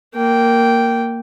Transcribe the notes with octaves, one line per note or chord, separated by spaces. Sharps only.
A#3 G5